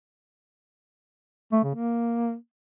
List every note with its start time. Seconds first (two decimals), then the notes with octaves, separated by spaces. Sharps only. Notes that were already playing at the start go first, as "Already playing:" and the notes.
1.52 A3
1.64 C#3
1.75 A#3